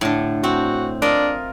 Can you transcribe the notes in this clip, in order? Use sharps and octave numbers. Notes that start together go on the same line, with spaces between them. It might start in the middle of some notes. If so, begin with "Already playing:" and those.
A2 D3
C4 F#4
D4 F4 A#4 D#5